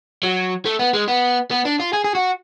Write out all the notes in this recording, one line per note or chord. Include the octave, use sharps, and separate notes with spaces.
F#3
A3
B3
G#3
B3
B3
D4
F4
G#4
G#4
F#4